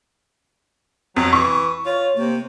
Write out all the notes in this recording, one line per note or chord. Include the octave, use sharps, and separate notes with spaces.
F2 F#3
E3 C#6
F4 C#5
C3 A#3